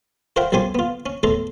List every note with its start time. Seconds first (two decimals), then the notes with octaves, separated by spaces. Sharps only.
0.36 F4 A#4 C5 E5 F#5 G5
0.52 B1 F#2 F3 G4 G#5 C6
0.75 B3 F4
1.06 C#4
1.23 E2 A2 A4 A#5 C6